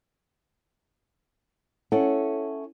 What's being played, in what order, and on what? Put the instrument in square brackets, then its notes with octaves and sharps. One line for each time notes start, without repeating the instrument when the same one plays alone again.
[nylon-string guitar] C#4 E4 A4 F#5